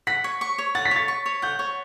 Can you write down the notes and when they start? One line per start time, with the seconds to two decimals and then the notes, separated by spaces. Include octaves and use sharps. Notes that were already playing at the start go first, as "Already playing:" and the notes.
0.07 F#5 B6
0.24 C#5
0.41 C#6
0.58 C#5
0.75 F#5 A6
0.85 B6
0.91 C#5 A6
1.08 C#6
1.26 C#5
1.42 F#5 G6
1.59 C#5